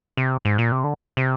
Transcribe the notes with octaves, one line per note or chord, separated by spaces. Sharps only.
C3
G#2
A#2
C3
D3
C3